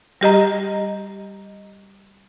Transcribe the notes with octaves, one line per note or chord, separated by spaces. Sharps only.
G3 G4 D#5 A#5